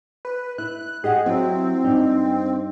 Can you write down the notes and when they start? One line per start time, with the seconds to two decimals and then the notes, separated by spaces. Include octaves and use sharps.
0.25 B4
0.58 E4 F#6
1.04 G4 G#4 D#5 F#5
1.26 F#3 C4 E4
1.84 G2 D#4